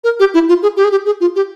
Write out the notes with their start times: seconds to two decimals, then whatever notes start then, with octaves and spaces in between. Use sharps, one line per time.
0.04 A#4
0.20 G4
0.34 E4
0.49 F4
0.63 G#4
0.77 G4
0.84 G#4
0.91 G4
1.06 G#4
1.21 F4
1.36 G4